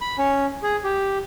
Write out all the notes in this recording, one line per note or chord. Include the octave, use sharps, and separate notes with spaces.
B5
C#4
G#4
G4